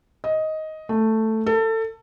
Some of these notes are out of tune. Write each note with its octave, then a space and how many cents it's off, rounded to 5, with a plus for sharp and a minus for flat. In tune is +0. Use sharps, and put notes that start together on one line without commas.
D#5 +10
A3 +5
A4 +25